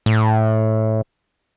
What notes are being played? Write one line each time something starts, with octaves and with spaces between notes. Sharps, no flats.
A2